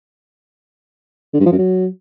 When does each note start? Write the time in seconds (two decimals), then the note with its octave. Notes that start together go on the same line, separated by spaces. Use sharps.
1.33 D3
1.40 G2
1.46 F3
1.52 F#2
1.58 F#3